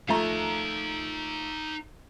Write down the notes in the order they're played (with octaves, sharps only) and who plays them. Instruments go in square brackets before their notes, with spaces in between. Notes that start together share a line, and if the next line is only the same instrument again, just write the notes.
[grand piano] F3 A3 A#5 [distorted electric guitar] D#4 F5